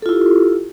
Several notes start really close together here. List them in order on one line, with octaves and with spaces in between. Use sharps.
A4 F4 E4 G4